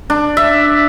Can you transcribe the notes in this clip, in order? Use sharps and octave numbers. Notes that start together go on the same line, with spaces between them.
D4
E5